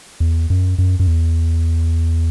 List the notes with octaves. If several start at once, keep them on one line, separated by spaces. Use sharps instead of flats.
E2
F#2
F#2
F#2
E2